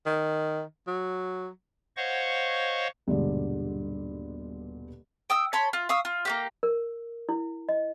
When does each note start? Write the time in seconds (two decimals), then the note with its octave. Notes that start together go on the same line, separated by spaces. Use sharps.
0.06 D#3
0.87 F#3
1.97 C5 C#5 D#5 F5 F#5 C#6
3.07 D#1 G2 B2 D3 G#3 D5
5.30 G5 D#6 E6
5.53 C#5 A5 B5 C6
5.73 F4
5.89 F5 C#6 D#6 E6
6.05 F4
6.25 A#3 F#4 G4
6.63 A#4
7.29 E4
7.69 D#5